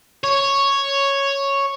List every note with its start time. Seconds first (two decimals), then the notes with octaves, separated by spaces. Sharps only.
0.24 C#5